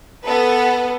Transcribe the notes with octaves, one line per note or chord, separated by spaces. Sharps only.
B3 A4 B4